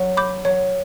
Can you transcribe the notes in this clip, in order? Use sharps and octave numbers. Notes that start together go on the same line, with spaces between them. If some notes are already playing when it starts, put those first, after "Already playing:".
Already playing: F#3
B5 D6 G6
F#3 C#5